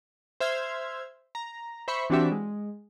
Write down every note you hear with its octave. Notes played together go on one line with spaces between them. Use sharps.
C5 E5 F6 G#6
A#5
C5 E5 B5 C#6
E3 C4 D4 F#4 G4 E5
G#3